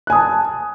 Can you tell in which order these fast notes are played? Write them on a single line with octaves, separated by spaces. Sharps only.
F#6 G#5 D#6 A5